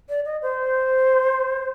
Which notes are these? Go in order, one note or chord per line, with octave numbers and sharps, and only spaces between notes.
D5
D#5
C5